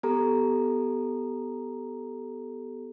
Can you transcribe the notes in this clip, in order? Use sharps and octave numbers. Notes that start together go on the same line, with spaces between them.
B3 G4 A4 A#5